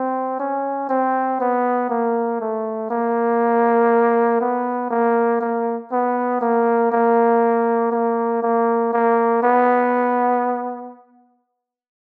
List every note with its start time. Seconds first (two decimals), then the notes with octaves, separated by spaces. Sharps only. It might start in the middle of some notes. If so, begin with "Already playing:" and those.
Already playing: C4
0.39 C#4
0.89 C4
1.40 B3
1.90 A#3
2.40 A3
2.90 A#3
4.41 B3
4.90 A#3
5.41 A#3
5.92 B3
6.41 A#3
6.92 A#3
7.92 A#3
8.42 A#3
8.93 A#3
9.42 B3